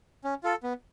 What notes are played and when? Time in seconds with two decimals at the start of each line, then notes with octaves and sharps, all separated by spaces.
0.24 C#4
0.43 F4 A4
0.63 B3